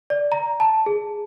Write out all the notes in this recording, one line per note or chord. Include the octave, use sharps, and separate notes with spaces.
D5
A#5
A5
G#4